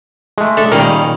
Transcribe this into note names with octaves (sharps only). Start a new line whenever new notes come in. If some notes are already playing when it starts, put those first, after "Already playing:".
G#3 A3
D4 A4 E5
A#2 D#3 G3 C#4 G#4 A#4